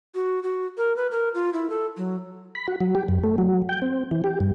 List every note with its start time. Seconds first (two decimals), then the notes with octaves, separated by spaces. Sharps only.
0.15 F#4
0.43 F#4
0.77 A#4
0.96 B4
1.11 A#4
1.34 F4
1.53 E4
1.70 A4
1.97 F#3
2.55 B5
2.68 F#4
2.81 F#3
2.95 G4
3.08 F#2
3.24 A3
3.38 F#3
3.69 G5
3.82 C4
4.11 E3
4.24 G4
4.40 G2